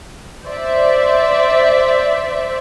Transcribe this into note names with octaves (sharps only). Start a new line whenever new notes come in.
C5 D5 E5